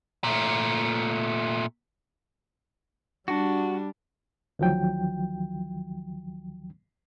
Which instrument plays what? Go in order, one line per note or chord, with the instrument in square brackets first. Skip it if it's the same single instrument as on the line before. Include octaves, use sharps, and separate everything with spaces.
[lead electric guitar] A#2 A3
[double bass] G3 [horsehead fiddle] D4 [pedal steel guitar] F#4
[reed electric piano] D2 D#3 F3 F#3 G5